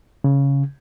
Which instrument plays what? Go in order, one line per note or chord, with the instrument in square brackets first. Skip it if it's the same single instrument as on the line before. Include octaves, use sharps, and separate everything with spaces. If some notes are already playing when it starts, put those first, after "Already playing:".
[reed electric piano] C#3